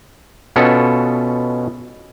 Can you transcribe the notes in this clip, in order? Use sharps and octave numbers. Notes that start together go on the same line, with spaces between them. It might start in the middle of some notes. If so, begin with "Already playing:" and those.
B2 B3 C#4 F4 A4